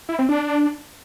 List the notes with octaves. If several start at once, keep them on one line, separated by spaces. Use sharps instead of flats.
E4
C4
D4